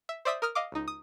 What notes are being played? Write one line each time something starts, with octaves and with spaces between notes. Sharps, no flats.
E5
C5 D5 E5 D#6 B6
A#4 D#6 F6
D#5 F5 D6
C#2 D#4
D#6